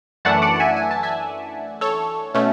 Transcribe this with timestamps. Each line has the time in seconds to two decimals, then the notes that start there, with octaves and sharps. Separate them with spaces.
0.25 F#2 E3 A3 D4 F#5 A5
0.42 D5 F#5
0.56 F#5
0.60 E5 G#5
0.77 G#5
0.91 A5
1.03 E5 G#5
1.81 A4 C#5
2.34 B2 A3 C#4